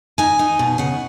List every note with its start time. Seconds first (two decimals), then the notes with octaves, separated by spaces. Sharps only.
0.18 D#4 G#5
0.39 D#4
0.59 B2
0.78 C#3 F#5